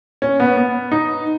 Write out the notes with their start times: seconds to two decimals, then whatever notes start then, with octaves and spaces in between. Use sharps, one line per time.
0.22 C#4
0.40 B3
0.57 B3
0.92 D#4